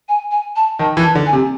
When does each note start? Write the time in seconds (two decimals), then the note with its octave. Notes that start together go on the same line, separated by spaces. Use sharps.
0.09 G#5
0.31 G#5
0.56 A5
0.79 D#3 A5
0.97 E3
1.04 A5
1.15 D3
1.26 G#5
1.33 C3